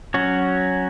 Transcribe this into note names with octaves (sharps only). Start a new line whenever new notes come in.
F#3 C#4 F#4